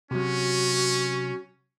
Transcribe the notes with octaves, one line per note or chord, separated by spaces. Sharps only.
C3 F#3 C#4 F#4